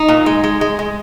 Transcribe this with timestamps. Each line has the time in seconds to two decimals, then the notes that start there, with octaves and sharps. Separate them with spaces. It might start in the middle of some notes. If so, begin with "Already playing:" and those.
Already playing: D#4
0.08 A#2
0.26 G#3
0.44 G#3
0.61 G#3
0.79 G#3